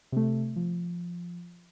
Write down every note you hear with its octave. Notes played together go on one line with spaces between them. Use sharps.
C3 A3
F3